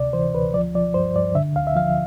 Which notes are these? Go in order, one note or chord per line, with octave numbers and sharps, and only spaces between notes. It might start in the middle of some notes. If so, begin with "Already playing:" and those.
Already playing: D2 C3 D5
E3 C5
D2 B4
F3 D5
F3 D5
G2 C5
G2 D5
D3 E5
D2 F5
E5
F3 F5